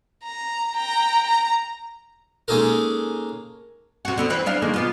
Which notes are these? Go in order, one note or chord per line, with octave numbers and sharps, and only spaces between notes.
A#5
G5 A#5
A#5
G#3 A#3 C#4 D#4 A4 A#4
C3 F#4
D3 B3 C4
E3 C4 B4
B3 D4 F5
D#3 G#3 A#3
B2 B3 F4